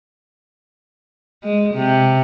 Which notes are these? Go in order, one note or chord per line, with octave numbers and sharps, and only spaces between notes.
G#3
C3